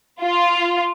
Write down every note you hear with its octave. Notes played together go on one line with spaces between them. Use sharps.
F4